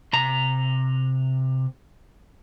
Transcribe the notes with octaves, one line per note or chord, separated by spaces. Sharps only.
C3 A#5